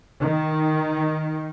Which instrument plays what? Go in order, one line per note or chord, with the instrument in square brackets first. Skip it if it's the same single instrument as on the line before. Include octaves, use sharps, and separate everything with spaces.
[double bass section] D#3